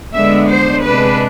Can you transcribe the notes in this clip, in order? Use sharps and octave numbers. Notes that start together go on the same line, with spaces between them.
D3 G#3 B3 D4 E5
C5
C3 G#3 D4 B4